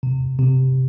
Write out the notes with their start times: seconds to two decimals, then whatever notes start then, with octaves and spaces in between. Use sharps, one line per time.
0.03 C3
0.39 C3